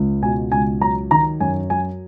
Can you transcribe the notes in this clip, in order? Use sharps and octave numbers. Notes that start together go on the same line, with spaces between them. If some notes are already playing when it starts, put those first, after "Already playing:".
Already playing: C#2
B2 G#5
C#2 G#5
F#3 A#5
D#3 A#5
F#2 G#5
F#3 G#5